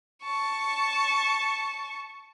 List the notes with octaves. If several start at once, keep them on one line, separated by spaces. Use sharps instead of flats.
A5 C#6